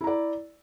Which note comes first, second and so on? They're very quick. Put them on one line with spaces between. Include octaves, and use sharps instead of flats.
E4 A#5 D5